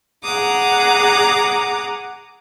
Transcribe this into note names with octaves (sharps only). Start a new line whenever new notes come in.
G#4 F#5 A#5 D6 D#6